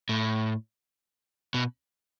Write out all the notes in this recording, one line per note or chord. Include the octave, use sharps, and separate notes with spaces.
A2
B2